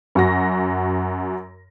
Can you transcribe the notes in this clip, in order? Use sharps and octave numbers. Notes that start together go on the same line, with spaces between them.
F#2 F#4 A#6